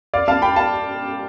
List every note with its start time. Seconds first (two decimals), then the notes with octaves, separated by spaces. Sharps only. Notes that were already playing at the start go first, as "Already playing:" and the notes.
0.14 D5 F5
0.28 F5 A5
0.42 G5 B5
0.56 F5 A5